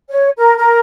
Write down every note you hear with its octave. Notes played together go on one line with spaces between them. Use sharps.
C#5
A#4
A#4